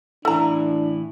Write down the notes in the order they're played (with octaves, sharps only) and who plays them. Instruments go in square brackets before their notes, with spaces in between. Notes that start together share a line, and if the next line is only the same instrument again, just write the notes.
[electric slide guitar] A2 E3 E4 [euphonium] D4 [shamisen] A4 A#5